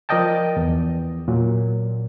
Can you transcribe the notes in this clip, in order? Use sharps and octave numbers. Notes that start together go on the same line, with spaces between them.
F3 A#4 D5 D#5 G5 A5
E2
A#2 F#3